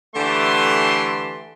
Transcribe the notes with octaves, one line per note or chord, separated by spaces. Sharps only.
D3 E3 A3 G4 A5 C6